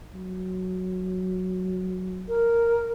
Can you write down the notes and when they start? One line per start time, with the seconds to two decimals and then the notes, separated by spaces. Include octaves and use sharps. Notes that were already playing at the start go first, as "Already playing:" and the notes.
0.15 F#3
2.28 A#4